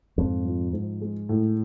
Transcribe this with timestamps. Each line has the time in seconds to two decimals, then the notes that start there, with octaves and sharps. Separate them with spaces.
0.17 F2 G#2
0.45 F3
0.73 G#2
1.01 G#3
1.29 A2